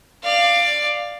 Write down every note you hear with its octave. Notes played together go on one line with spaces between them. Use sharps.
D5 F5